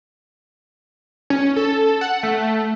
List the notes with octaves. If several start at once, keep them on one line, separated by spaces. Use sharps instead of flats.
C#4
A4
F#5
A3